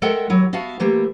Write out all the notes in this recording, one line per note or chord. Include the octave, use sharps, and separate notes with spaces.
G#3 A4 A#4 E5 F#5 G5
D#2 F#3 E4
B3 F#4 E5 F5 A5
E3 A3 A#3 G4